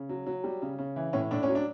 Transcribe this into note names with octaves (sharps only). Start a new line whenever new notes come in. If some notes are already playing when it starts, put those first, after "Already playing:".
Already playing: C#3
F#3
F#3
G3
C#3
C#3
E3
A2 C#4
A2 D4
C#4
F#3
D4